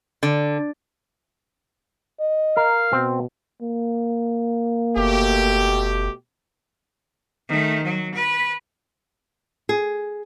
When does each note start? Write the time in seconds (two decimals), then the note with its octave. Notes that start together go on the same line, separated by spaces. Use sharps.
0.23 D3
2.20 D#5
2.57 A#4 F5
2.93 B2 C4
3.62 A#3
4.97 F#1 B2 A3 G4
7.49 D#3 A3
7.83 F#3
8.15 B4
9.69 G#4